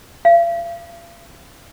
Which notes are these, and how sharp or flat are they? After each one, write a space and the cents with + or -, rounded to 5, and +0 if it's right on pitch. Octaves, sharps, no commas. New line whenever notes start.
F5 -40